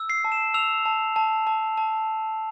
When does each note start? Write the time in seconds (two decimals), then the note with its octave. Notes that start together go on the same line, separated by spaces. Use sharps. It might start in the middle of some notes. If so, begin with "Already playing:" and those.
Already playing: E6
0.10 C7
0.25 A5
0.32 E7
0.54 E6 F7
0.86 A5
1.16 A5
1.47 A5
1.77 A5